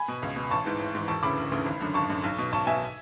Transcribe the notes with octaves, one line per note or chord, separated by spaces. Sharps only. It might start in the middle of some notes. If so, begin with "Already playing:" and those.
Already playing: G#5 B5
B2
C#2
B2
A1 A5 C#6
G#2 E3
A1
G#2 E3
E1 A5 C#6
D2 C#3 E3 B5 D6
E1
D2 C#3 E3
G#1
F#2 D3
G#1 A5 C#6
F#2 D3
B1
B2
B1 A5 C#6
B2 E5 G#5